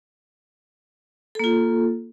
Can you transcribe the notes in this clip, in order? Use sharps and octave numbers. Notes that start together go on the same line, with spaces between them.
A#3 F4 A4